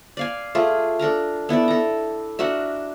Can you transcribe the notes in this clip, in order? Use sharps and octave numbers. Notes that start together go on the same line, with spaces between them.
D5 F5 G#5
A3 F4 G#4
D4 A4 A#4 A#5
B3 E4 A4 D5
A4 A#5
D4 F#4 A#4 E5